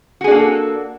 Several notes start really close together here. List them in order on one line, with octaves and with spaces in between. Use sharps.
F#4 G#4 D4 A#3 A4